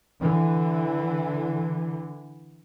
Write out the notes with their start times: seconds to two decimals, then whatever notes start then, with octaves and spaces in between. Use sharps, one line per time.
0.21 D3 E3